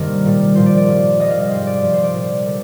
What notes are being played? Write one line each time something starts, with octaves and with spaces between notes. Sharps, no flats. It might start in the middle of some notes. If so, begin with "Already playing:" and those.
Already playing: G2 C3 D#3 G3 A#3 A#4 C5
A#2 G3
A#2 F3 C5
D5
D5
G2 F3
F2 C3 G3 D#5
F5
D#5
G#2 G3 C5
D5
G2 F3
C5
D5
A#2 G3
D3 G3